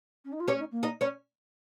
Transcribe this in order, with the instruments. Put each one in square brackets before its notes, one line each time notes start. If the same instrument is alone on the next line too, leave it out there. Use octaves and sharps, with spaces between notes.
[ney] C#4
D#4
F4
[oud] C#4 C#5 [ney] G4
[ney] D#4
A#3
[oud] D#4 D#5
C#4 C#5